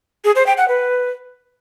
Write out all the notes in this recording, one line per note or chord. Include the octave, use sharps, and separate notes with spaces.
G#4
C5
G5
F#5
B4